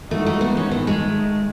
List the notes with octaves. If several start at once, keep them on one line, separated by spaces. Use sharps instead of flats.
E3 G#3 A3 D#4 F#4
A3
B3
C#4
G#2 D#3 A3 B3 D#4
G#3